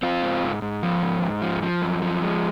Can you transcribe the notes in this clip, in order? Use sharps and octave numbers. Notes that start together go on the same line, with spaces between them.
C4 F4
G#2
G#2
G#2
F3
G#2
G#2
F3
F3
F#2
F3
G#3